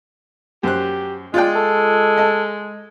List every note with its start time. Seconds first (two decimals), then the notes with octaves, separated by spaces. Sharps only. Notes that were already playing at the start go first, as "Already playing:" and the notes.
0.63 F#2 G4 C5 F#6
1.34 G#3 F4 D5 G5
1.55 A4
2.17 D#5 A5